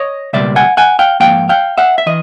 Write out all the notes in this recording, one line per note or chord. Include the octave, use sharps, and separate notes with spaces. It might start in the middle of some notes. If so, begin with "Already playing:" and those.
Already playing: C#5 D#5
C#2 B2 G3 A#3 D5 E5
F#5 G#5
F#5 G#5
F5 G5
G#2 F3 A#3 F5 G5
F5 G5
E5 F#5
E5
E3 D#5